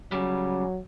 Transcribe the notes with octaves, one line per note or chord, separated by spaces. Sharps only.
C#3 F#3 G3